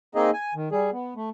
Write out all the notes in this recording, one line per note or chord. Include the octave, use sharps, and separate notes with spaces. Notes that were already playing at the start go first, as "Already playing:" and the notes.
A#3 C4 D#4 G#4 D#5
G#5
D#3
G3 G#4
B3
A3